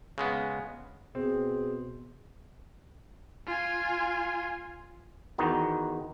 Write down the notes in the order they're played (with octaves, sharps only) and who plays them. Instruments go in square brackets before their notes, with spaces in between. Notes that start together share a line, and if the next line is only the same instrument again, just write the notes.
[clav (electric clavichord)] C#3 G#3 B3
[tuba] B2 [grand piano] C4 [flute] G#4
[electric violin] F4 G#5
[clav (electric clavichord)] E2 D#3 D#4 F#4